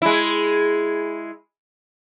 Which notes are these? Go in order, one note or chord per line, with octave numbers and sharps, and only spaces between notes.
G#3 E4